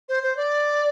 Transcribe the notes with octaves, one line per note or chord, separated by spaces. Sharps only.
C5
C5
D5